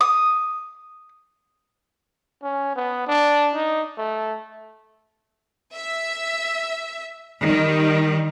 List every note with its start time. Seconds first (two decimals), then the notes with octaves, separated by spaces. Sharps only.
0.01 D#6
2.43 C#4
2.76 B3
3.07 D4
3.54 D#4
3.98 A3
5.74 E5
7.46 D#3 G3